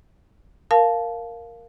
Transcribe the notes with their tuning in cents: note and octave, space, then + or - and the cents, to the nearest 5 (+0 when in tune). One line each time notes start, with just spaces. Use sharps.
A#4 +0 F5 +0 A5 -20